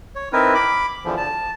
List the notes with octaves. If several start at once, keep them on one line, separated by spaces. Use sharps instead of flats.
C#5
C4 D#4 E4 A#4 B4
B5 D6
E2 D3 F3
A5